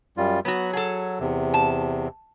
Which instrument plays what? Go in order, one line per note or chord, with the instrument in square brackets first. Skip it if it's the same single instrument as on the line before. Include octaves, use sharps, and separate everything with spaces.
[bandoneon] F#2 G3 F4
[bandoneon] F#3 [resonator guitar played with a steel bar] B3 F#4
[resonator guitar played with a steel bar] G#4 A4
[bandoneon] E2 C3
[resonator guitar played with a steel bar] A5